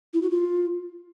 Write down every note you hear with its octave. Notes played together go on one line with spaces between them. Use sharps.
E4
F#4
F4